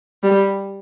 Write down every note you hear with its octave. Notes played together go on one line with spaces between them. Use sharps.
G3